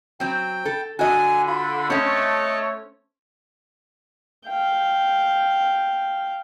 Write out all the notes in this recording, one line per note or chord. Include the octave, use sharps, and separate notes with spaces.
F#3 C4 G5
A4
D3 F#4 D#5 G#5
F4 B5
A3 C4 C#4 C#5 D#5 A5
F5 G5